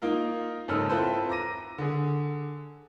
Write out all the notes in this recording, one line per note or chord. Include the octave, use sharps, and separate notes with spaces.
A#3 D#4 F4 A#4
F#1 G#2 C#4 A4 E6 F6
C4 E4 F4 A4 B4 C5
A#5 D6 A#6 D#7
D3 G#4